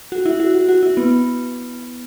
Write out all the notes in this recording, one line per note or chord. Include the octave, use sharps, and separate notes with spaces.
F#4
E4
F#4
F#4
F#4
E4
B3